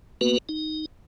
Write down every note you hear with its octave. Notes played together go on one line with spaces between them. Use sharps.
A#3 B3 F#4 B4
D#4